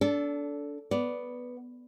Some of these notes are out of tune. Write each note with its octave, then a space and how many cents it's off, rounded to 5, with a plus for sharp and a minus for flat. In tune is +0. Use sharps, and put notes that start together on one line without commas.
D4 -25 A4 +0
B3 +0 D5 -10